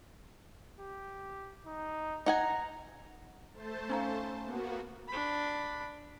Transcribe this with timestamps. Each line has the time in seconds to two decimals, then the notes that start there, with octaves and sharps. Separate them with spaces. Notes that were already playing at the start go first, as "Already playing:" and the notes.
0.79 G4
1.66 D#4
2.26 D#4 F#5 G#5 A#5
3.54 A3 C5 A5
3.89 C#4 D#4 F5
4.42 A#3 B3 F#4
5.08 D4 B5